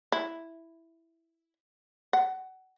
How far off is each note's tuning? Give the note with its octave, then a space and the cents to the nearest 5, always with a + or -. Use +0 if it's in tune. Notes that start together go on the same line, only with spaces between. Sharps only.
E4 +0
F#5 +25